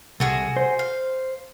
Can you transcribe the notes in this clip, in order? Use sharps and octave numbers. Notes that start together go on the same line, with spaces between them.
C2 A3 F#4 G#4
C5
F5